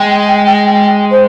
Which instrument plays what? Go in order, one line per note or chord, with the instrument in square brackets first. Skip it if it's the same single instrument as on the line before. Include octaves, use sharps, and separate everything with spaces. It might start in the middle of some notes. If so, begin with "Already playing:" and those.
Already playing: [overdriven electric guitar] G#3 [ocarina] G5
[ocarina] C5